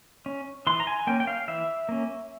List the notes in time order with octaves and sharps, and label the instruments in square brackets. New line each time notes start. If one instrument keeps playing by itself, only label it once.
[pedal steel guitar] C#4
E3 C6
A#5
G#5
A#3 C#4 G5
G5
F5
E3 E5
A#3 C#4